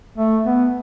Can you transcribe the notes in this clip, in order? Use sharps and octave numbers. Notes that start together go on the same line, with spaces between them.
A3
B3